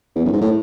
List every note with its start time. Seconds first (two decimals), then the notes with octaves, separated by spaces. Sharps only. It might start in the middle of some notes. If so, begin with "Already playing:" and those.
0.16 E2
0.25 F#2
0.33 G#2
0.42 A2